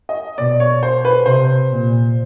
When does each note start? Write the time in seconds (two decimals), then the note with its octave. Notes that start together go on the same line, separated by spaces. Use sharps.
0.09 D#5
0.38 B2 D5
0.60 C#5
0.83 C5
1.05 B4
1.26 C3 C5
1.71 A#2